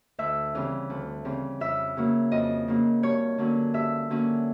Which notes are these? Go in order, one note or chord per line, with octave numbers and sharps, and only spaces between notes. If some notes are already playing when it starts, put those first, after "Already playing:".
D2 E5
C#3 E3 G3 C4
D2
C#3 E3 G3 C4
F2 E5
C#3 F#3 A#3
F2 D#5
C#3 F#3 A#3
G2 C#5
D3 F#3 A#3 C#4
G2 E5
D3 F#3 A#3 C#4